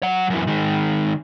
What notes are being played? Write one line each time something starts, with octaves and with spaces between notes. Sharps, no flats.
F#3 F#5
F#2 E3
D#3 G#3